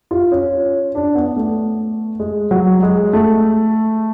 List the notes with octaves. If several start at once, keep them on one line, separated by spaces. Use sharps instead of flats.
F4
C#4
D4
B3
A3
G#3
F#3
G#3
A3